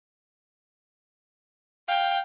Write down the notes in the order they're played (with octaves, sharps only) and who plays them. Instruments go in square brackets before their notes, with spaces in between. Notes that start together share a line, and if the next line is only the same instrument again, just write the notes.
[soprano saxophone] F5 [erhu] G5